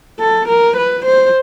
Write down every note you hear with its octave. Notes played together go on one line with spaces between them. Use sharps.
A4
A#4
B4
C5